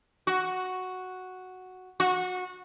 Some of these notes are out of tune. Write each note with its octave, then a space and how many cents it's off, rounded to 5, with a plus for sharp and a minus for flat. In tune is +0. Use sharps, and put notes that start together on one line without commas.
F#4 +0
F#4 -20